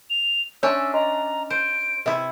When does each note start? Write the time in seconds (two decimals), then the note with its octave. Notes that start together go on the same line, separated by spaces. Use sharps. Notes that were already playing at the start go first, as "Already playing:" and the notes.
0.10 F7
0.63 C#4 D4 C#5 E5 C6 E6
0.94 D#5 A#5 C6
1.50 C5 D7
2.06 C3 E4 B4 E5 D#6